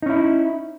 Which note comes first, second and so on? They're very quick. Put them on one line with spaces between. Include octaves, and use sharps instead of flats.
D#4 C#4 E4